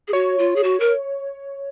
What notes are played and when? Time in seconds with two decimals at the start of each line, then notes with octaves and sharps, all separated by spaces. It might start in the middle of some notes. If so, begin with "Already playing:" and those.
0.08 G#4
0.13 F#4 C#5
0.39 F4
0.56 G#4
0.63 F#4
0.80 A#4